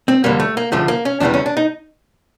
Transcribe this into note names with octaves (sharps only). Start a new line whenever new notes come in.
C4
F2 D3 G3 A#3
A3
A#3
D2 C#3 F3 A3
A#3
C#4
E2 C#3 E3 G3 D4
C#4
D4
D#4